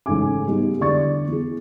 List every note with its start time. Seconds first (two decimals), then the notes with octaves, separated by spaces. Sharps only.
0.06 A1 G#2 C#3 A4 G#5 D6
0.47 G3 G#3 B3 D#4 G#4
0.80 E2 D3 D5 C#6 A6
1.28 E2 G#4